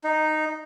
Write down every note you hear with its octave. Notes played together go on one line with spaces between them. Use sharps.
D#4